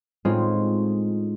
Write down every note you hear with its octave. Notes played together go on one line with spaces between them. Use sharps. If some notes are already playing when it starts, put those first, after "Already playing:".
A2 G#3 C4 C#4 D#4 F4